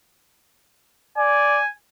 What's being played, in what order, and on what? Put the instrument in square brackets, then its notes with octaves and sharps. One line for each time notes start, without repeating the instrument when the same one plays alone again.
[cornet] D5 [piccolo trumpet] G#5